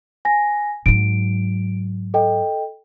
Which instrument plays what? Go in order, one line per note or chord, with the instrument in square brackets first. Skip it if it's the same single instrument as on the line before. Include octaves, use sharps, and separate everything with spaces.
[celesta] G#5 A#6
[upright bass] G#2 F#3 [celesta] D7
[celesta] A4 D#5 G5